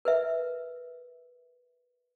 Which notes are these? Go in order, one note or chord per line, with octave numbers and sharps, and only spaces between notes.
A#4 B4 E5